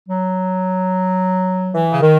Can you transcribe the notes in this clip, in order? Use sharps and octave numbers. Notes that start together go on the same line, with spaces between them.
F#3
E3
C#3
D#3